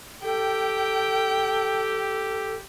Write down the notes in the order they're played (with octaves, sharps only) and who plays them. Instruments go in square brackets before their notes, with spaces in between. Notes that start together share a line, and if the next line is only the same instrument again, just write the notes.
[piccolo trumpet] G4 [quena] A4 [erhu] G5